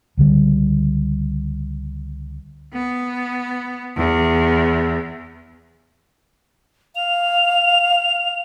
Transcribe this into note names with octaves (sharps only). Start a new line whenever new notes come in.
C#2 D3 G3
B3
E2
F5 F7